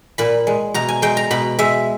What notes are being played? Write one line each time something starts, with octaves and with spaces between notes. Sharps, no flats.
A#2 B5
G#3
B2 A#5
G#5
G#3 G5
A#5
B2 B5
G#3 E5